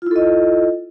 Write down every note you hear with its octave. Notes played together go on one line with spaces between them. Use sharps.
E4 F4 A4 D#5